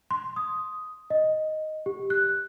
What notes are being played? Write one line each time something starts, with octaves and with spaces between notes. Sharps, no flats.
C6
D#6
D#5
G4
F#6